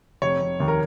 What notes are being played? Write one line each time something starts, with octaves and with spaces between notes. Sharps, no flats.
F1 C#5
F1
D#2
A#4